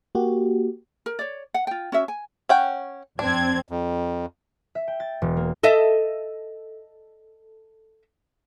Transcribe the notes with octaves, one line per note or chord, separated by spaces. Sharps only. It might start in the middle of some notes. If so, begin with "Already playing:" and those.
A#3 F#4 G4
A#4
C#5 D5
F#5
F4 G5
C#4 F#4 E5
G#5
C#4 F#5 G5
F2 C4 D4 G#6
F2
E5
G5
A6
E1
A#3
A4 D#5 E5